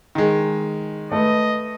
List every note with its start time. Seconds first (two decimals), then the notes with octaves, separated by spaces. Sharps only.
0.15 D#3 G#3
1.12 A3 B4 D#5